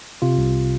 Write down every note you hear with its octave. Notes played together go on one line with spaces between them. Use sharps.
C3 F4
C2